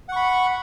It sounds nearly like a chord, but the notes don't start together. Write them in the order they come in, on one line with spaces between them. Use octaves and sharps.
F#5 C#6 B5